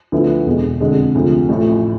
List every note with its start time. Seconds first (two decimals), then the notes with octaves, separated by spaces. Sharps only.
0.12 D2 D3 F3 B3 E4
0.46 E1 E2 B2 G#3
0.81 F2 D3 G#3
1.15 D2 C3 F3
1.49 A1 A2 F3 A3